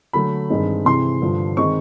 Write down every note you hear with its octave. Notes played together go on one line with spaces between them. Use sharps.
D3 F#3 A3 B5
G2 D#3 G#3 C4 D#4
C3 E3 G#3 C4 C6
G2 D3 F3
D#3 G#3 C4 D#4 C#6